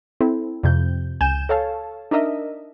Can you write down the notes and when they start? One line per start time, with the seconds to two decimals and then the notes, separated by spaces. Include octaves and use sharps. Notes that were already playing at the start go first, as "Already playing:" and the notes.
0.21 C4 E4 A4
0.63 F2 C3 G6
1.21 C#2 G#5 G6 E7
1.49 A4 C#5 F5 A5
2.11 D4 D#4 A#4 D#5 E5